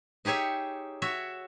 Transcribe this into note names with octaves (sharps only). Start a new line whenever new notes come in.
D#4 G4 G#4 C#5 E5
F#4 C#5 E5